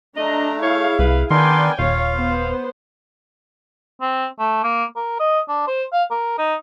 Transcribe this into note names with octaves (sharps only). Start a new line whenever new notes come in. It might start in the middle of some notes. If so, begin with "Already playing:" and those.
A3 D4 D#5 A#5
E4 G#4 C#5 F5
C2 B4
D#3 B3 D4 A#4 D5 G5 G#5 C6
D#1 F4 C#5 F5
B3 B4 C5
C4
A3
A#3
A#4
D#5
D4
C5
F5
A#4
D#4